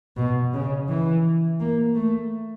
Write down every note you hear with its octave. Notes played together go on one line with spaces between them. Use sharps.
B2
C#3
E3
A#3
A3